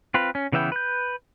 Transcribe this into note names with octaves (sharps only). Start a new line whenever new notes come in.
C4 F4 B4
C#4
C#3 E3 B3 E5 G5
B4 G6